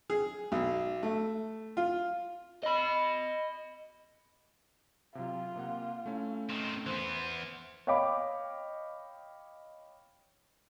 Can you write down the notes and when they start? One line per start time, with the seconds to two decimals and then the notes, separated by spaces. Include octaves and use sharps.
0.10 G#4
0.52 B1
1.03 A3
1.77 F4
2.63 D#5 B5
5.15 C3 F#3 F4
5.56 C3 A#3 F#5
6.06 A3 C#4 E4
6.49 D#3 C4
6.86 E3 B3 C5
7.87 C#5 D#5 F5 G5 B5 D6